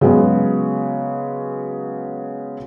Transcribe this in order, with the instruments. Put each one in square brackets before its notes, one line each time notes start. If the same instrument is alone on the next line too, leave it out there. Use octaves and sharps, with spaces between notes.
[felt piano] C#3 F#3 G#3 B3